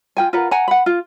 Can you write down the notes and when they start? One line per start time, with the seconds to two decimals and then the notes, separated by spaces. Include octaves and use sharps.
0.17 F4 G5 G#5
0.33 F4 A#4 B4 F#5
0.51 F#5 G#5 A#5
0.68 F#5 B5
0.86 F4